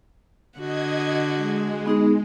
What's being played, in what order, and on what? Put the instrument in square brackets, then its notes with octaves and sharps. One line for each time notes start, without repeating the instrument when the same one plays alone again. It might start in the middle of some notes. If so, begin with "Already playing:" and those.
[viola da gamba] D3 F#4 [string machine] D#5 G#6
[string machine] G#3
[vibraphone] B3 D#4 G#4